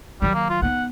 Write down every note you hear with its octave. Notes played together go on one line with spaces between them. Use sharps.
D#3 F#3 G3
A#3
F4
B3 D#4 F#5